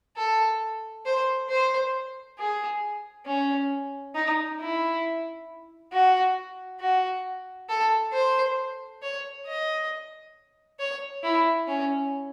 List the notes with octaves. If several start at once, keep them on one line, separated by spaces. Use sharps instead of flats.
A4
C5
C5
G#4
C#4
D#4
E4
F#4
F#4
A4
C5
C#5
D#5
C#5
E4
C#4